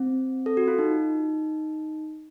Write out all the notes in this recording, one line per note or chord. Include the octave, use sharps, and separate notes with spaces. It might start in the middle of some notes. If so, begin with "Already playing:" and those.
Already playing: C4
A4
F#4
F4
D#4